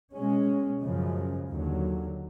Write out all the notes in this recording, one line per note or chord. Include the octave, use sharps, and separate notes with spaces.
B2 G#3 C#4
F#2 C#3 F3 G#3
D#2 D3 F#3